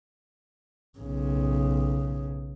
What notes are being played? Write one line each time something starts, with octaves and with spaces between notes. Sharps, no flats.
B1 C#3